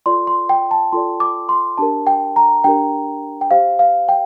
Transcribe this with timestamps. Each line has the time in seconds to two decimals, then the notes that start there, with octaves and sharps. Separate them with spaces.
0.06 F4 A4 D5 C6
0.27 C6
0.49 G5
0.71 A5
0.92 F4 A4 D5 C6
1.20 D6
1.49 C6
1.78 D4 G4 A#4 A5
2.07 G5
2.36 A#5
2.64 D4 G4 A#4 G5
3.41 G5
3.51 G4 C5 F5
3.79 F5
4.09 G5